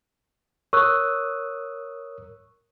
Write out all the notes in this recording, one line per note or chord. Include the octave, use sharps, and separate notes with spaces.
A#4 C#5 C#6 D#6 E6 F#6